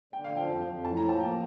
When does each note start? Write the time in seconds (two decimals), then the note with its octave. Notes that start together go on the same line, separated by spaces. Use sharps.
0.13 D3 G5
0.24 F5
0.31 F3
0.37 G5
0.49 F2
0.67 F2
0.84 A2 A5
0.97 A#5
1.03 F3
1.09 A5
1.20 A#3 G5